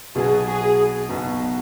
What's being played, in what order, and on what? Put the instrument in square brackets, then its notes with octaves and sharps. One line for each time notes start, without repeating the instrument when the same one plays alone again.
[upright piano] B1 B2 F#3 B3 F#4 [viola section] G#4
[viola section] G#4
[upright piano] B1 B2 F#3 B3 F#4